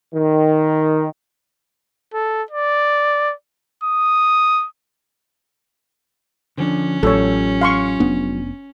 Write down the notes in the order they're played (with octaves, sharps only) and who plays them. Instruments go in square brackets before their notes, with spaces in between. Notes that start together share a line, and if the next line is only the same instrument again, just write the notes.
[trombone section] D#3
[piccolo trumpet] A4
D5
D#6
[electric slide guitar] D3 F3 D4 [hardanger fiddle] C#4
[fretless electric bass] A1 [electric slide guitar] F#3 F4 G4 [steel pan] A4 C#5
[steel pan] F5 C6 C#6
[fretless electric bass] F1 B3 D4